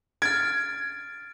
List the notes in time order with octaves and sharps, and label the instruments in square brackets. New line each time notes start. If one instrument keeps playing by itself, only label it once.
[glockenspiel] F6 A6 D7 [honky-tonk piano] G#6